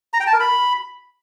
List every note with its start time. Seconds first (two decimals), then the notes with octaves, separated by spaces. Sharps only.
0.14 A#5
0.20 G5
0.27 A5
0.33 A#4
0.40 B5